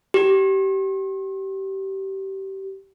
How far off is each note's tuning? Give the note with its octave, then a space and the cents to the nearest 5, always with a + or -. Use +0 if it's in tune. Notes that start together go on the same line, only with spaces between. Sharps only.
G4 -25